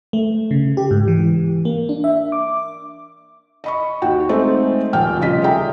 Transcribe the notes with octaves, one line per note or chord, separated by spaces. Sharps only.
A3
C#3
G4
G#2
E3
A#3
D4
E5
D6
D#5 B5 C#6
D#2 F#4 G5
G#3 A3 C4 D#4 A4
D#1 F3 G5 F6
F1 C#3 G3 F4 D#5 B6
G#4 A4 D5 E5 G5 A#5